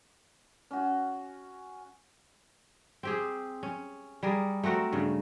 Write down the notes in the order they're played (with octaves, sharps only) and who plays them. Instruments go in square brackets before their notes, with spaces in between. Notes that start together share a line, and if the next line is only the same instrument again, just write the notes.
[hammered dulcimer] C#4 F#4
[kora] C4 G4 G#4
C#4
G3 G#4 A#4
A3 C4 F#4 A#4
G2 C#3